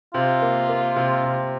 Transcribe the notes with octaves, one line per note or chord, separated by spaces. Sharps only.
C3 F4
A#3
A#3
C3
C3